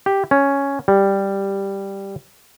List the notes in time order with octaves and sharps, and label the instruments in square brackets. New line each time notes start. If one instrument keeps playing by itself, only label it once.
[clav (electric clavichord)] G4
C#4
G3